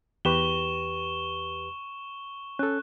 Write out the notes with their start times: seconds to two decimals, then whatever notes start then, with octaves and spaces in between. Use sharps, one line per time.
0.25 E2 G4 B4 C#6 E7 G7
2.59 C#4 A4 F#6